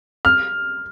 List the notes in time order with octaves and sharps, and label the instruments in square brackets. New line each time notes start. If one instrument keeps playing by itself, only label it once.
[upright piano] F6